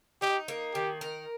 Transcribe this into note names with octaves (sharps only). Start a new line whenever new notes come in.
D#4 G4
A#3
D#3 G4
A#4